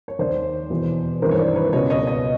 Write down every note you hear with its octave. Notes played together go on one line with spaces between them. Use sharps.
C#5
D#2 D#3 C5 D5
E2 B2
G#1 G2 E3 A#4 C5
C#5
C5 D5
B4 C#5
C#2 B2 C#5 D#5
C#5 D#5
C#5 D#5